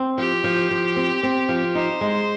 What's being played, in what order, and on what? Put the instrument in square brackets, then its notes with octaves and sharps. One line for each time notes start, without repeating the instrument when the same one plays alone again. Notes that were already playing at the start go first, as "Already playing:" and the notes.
Already playing: [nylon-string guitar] C4
[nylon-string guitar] F3 [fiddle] G4
[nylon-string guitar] F3
F3
C4
C4
F3
[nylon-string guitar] D#4 [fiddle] C5
[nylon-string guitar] G#3